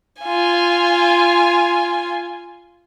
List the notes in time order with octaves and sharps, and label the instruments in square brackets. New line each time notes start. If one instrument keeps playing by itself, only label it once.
[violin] F4 G#5